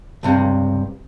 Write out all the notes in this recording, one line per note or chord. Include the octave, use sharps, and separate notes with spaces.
C#2 G2 C3